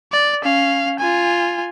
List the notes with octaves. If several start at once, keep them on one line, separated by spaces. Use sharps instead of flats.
D5
C#4 F5
F4 G#5